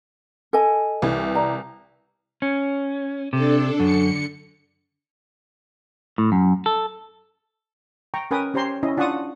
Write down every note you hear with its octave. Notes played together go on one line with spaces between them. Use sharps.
A4 D#5 G#5
C2 E3
D5 A#5
C#4
C3 D4 A4
F#2 D3 C#7
A2
F#2
A4
G5 A#5 C#6
C#4 A#4 B4 G5 G#5 D#6
C#4 G4 C5 C#5 A#5 C6
C#4 E4 D#5
D4 F4 F#5 A5 C#6 D#6